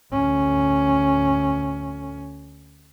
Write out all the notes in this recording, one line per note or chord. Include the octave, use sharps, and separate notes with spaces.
D2 C#4